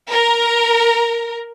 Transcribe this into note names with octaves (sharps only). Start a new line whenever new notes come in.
A#4